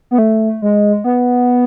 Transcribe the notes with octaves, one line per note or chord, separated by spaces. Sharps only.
B3
A3
G#3
B3